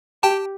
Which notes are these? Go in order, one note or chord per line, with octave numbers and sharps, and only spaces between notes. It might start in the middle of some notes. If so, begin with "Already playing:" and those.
G4 G5 A5